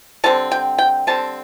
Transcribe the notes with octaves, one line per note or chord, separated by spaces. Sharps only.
D3 G3 C4 A5
G5
G5
D3 G3 C4 A5